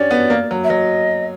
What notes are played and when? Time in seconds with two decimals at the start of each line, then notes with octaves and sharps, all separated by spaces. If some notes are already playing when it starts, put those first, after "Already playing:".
Already playing: C#4 D4 G4 D5
0.11 B3
0.30 A#3
0.51 F#3
0.64 E5
0.69 F#3 D#5